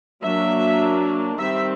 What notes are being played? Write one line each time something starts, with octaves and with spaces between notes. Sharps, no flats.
F#3 A#3 D4 E5
D#3 G3 C4 E5